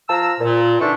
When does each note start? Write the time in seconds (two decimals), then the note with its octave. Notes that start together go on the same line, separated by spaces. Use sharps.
0.09 F3 A5 A#5 E6
0.40 A#2
0.80 D3 E3 D4 D#4 E5 C#6